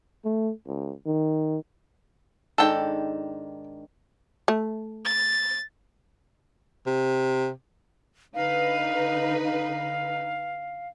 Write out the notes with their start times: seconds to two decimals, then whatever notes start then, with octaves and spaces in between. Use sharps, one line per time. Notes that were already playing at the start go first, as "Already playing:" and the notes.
0.25 A3
0.67 C#2
1.06 D#3
2.58 G#2 D#3 D4 A4 G5
4.48 A3
5.05 A6
6.86 C3
8.34 D3 D#4 B4 F5
9.45 F5